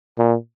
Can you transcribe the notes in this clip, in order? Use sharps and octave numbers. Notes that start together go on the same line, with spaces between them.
A#2